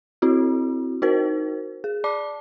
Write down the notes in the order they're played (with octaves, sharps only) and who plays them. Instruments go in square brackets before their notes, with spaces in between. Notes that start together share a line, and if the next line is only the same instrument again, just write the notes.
[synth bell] C4 E4 F#4
D#4 F#4 A#4 C5
G#4
D5 A5 D6